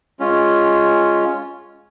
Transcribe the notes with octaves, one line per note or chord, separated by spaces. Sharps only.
G#3 C#4 F4